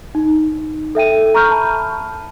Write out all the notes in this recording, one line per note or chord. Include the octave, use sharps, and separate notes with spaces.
D#4
A4 E5 G5 D#7
A#5 C#6 F6 G6
A5 B5